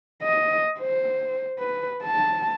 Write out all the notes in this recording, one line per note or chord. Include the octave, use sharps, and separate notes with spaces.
D#5
C5
B4
A5